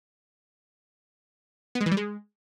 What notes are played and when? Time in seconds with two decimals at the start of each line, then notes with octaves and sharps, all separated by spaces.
1.75 B3
1.81 G#3
1.86 E3
1.91 G3
1.97 G#3